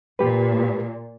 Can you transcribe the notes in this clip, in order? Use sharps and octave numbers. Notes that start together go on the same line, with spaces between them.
A#2 G4 B4